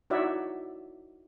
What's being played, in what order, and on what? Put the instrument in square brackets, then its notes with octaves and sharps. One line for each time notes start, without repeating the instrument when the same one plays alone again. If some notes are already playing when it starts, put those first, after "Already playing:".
[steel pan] D#4 E4 F#4 C#5 D5 E5